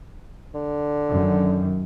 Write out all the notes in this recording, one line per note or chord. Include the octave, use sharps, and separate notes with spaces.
D3
F#2 D#3